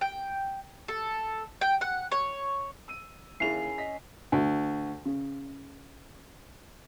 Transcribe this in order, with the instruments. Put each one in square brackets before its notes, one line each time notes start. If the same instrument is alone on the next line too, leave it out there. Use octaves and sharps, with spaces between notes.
[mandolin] G5
A4
G5
F#5
C#5
[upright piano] E6 D#7
[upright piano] D#2 F7 [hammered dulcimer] C#4 [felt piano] E4 G#4 [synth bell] C7
[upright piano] D#5 B6
[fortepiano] D2
C#3